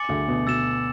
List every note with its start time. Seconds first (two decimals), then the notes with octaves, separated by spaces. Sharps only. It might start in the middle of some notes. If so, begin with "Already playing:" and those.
Already playing: G#5 D6 A6 C#7 F#7
0.09 D2 D3
0.28 B2
0.47 B2 E6 A6 E7